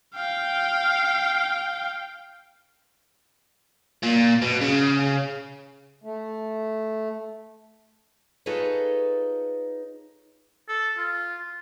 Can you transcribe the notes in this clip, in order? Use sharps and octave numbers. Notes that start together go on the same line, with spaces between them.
F5 G5
A#2
B2
C#3
A3
D#4 F4 G#4 A4 B4 C#5
A4
F4